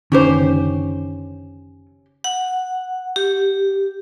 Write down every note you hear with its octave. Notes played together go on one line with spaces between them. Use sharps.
F#1 D3 D#3 C#4 G4 C5
F#5
G4